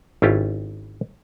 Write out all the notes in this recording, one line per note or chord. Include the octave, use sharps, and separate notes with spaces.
G#1 C#4 E4 F4 G4